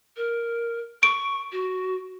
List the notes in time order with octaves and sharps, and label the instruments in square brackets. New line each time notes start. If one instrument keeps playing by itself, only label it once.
[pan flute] A#4
[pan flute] C#6 [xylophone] D7
[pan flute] F#4